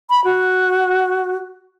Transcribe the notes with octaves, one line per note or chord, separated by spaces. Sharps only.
B5
F#4